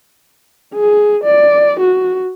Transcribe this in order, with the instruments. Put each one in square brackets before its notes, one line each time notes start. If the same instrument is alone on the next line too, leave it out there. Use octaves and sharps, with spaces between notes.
[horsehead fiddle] G#4
D5
F#4